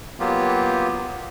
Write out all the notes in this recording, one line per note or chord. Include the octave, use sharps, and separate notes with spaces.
F#3 A#3 B3 F4 G4